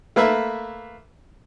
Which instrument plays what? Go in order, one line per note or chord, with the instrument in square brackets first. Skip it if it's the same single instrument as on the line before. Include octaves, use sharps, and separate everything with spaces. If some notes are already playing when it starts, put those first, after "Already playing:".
[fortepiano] A3 A#3 B4 E5